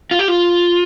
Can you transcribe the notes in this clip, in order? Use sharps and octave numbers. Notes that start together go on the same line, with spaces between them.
F4
G4
F4